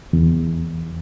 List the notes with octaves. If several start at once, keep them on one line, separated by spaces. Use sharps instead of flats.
E2